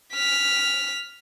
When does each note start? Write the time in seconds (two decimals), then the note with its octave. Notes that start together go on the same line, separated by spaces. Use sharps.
0.13 F6 B6